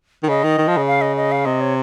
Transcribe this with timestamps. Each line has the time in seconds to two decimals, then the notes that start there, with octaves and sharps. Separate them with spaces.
0.23 D#3
0.29 C#3 D#5
0.44 D#3
0.58 D#3
0.68 F3
0.77 C#3
0.87 F5
1.01 D#5
1.17 D#5
1.32 F5
1.45 C3 D#5
1.61 C#5